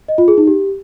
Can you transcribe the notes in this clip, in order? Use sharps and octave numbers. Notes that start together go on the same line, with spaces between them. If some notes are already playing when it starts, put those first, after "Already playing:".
D#5
F4
G#4
D#4
G4